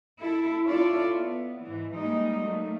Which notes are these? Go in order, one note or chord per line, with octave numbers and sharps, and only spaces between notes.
E4 A4
D4 E4 F4 A4 C#5 D5
B3
G#2 E3
G3 G#3 A#3 D#4
F#3 A3 A#3